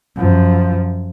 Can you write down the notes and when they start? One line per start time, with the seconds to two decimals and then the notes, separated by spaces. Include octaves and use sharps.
0.16 F#2 F3